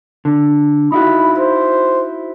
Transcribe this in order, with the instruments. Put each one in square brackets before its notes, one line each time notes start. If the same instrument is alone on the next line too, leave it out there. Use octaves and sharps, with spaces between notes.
[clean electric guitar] D3
[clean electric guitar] D#4 E4 F#4 [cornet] B5
[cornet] C5